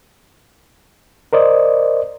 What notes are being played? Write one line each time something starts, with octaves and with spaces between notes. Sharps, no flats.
A#4 C5 D5 D#5